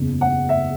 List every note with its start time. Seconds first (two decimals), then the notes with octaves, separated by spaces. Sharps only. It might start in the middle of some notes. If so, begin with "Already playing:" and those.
Already playing: F#1 E2 C#3
0.21 F#5
0.49 E5